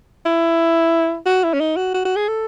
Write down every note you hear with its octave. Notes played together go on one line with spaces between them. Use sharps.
E4
F#4
E4
C#4
D#4
F#4
F#4
F#4
G#4
A4